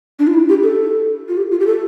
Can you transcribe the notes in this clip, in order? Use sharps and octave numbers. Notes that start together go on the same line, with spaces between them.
D4
F4
E4
G4
A4
F4
G4
F4
G4
A4